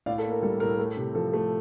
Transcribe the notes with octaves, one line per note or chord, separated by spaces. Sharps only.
A2 D5 F5
A4
A#3
A#4
G3 A4
A2 A#4
A3
C3
F3 A4
A3